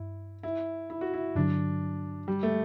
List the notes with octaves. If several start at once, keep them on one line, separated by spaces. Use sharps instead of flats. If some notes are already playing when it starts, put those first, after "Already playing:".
Already playing: G2 E4
E4
E4
F#4
E4
G2 D3 F#3 D4
G3
A3